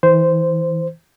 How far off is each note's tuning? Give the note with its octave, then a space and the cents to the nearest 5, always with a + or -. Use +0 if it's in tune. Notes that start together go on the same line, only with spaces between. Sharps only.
E3 -25 C5 -10